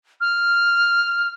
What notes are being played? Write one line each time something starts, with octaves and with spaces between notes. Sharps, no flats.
F6